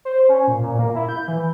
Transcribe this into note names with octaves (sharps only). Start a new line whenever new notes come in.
C5
C#4
A#2
A#2
A#3
E4
G6
E3